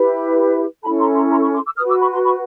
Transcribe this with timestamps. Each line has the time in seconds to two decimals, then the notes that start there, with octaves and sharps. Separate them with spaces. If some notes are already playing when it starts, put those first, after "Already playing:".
Already playing: E4 G4 B4
0.83 C#4 E4 A4 A5 B5
0.99 A#5 C6
1.15 A#5 C6
1.31 A#5 C6
1.41 B5 C#6
1.54 C6 D6
1.65 D6 E6
1.77 F#4 B4 D#6 F6
1.89 D6 E6
2.00 B5 C#6
2.12 A#5 C6
2.24 B5 C#6